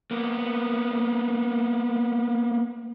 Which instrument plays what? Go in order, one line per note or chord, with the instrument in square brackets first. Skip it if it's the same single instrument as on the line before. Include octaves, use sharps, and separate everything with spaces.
[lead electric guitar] A#3 B3